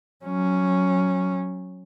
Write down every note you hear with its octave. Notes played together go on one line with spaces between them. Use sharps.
F#3 C#4